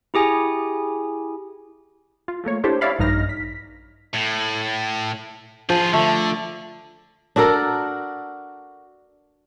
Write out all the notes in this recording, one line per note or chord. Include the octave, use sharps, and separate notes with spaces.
E4 G4 G#4 G#5
F4
F3 A3 A#3 C#5
D4 E4 G4 A4 C5 C#5
C#4 C#5 D5 E5 F5 B5
A#1 G2 D#4 F6 A#6
B6
A2
F3 F4 G#4
D3 A3
D4 F#4 A4 A#4